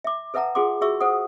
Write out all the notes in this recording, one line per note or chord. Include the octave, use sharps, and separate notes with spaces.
E5 D6
A4 B4 E5 F#5 A5 A#5
F4 G#4 A4 F#5 C6 D6
F#4 G#4 E5 C#6 E6
A4 C5 F#5 D#6